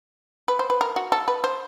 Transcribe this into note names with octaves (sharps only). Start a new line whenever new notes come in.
B4
C5
B4
A#4
F#4
A4
B4
C5